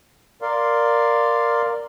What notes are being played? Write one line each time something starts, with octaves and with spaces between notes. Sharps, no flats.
A#4 D5 F5 C6